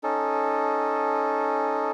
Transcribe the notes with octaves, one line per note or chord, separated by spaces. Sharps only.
C#4 D#4 A4